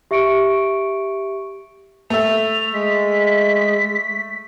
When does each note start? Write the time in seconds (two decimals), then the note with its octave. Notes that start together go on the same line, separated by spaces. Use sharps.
0.11 G4 E5 C#6 C#7 D7
2.10 A3 E5 F7
2.73 G#3 B6